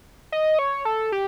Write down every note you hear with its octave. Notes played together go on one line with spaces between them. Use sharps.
D#5
C#5
A4
G4